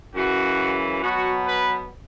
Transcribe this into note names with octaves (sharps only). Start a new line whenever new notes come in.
F#2 C#3 E3 F#4
B2 F#3 B3 F#4
B4